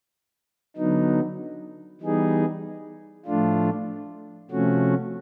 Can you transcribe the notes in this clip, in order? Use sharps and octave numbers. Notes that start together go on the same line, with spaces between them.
D3 F#3 B3 D#4
E3 G3 B3 D#4 G#4
A2 F3 A3 D4 F4
C3 F3 A3 C#4 F#4